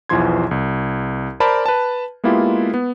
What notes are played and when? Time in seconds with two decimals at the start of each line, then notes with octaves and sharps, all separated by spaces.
0.09 B1 E2 E3 F3 C6 G#6
0.51 C2
1.40 A#4 C5 D5 A5 B5
1.66 B4 A5
2.24 G#3 A#3 B3 E4 F4 G4
2.74 B3